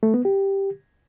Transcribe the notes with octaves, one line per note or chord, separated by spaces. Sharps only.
A3
B3
G4